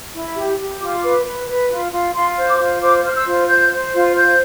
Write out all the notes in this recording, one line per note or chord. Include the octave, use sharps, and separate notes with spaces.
E4
G4
G4
F4 D6
B4
B4
B4
F4
F4
F4 C6
C5
D6
F4
C5 D6
C5 F6
E6
F4
C5 G6
C5
F4
C5 G6